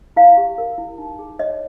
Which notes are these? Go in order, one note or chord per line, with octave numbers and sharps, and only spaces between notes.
E4 F5
G4
A#4
E4
D#4
G#4
C#5 D#5